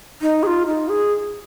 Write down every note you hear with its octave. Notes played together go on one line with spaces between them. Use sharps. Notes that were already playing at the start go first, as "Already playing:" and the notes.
D#4
G#4
F4
D#4
G#4